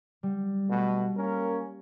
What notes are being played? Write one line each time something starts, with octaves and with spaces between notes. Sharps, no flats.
G3
B2 A3
A#3 C#4 A#4